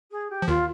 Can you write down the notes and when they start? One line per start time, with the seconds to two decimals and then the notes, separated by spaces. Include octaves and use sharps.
0.11 G#4
0.30 G4
0.42 F3
0.48 D#2 D#3 F4